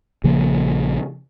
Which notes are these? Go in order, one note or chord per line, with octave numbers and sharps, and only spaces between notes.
A#1 C#3 F3 A#3